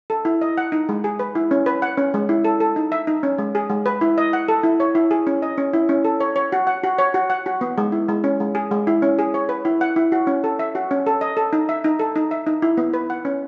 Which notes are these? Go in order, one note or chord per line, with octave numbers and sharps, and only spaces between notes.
A4
E4
D#5
F#5
D#4
G#3
G#4
B4
E4
C#4
B4
F#5
C#4
G#3
E4
A4
A4
D#4
E5
D#4
C#4
G#3
G#4
G#3
B4
E4
D#5
F#5
A4
E4
C#5
E4
G#4
C#4
D#5
C#4
E4
C#4
A4
C#5
C#5
F#4
F#5
F#4
C#5
F#4
F#5
F#4
B3
G#3
E4
G#3
C#4
G#3
G#4
G#3
E4
C#4
G#4
C#5
B4
E4
F#5
E4
F#4
C#4
A4
E5
F#4
C#4
A4
D#5
A4
D#4
E5
D#4
A4
D#4
E5
D#4
E4
B3
B4
F#5
C#4